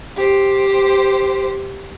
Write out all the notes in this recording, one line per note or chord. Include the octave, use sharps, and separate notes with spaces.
G4 C5